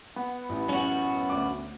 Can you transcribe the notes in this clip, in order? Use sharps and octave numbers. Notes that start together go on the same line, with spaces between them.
B3
A1
C#4 F#4
D2 D6